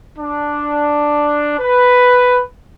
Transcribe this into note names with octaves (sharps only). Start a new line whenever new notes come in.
D4
B4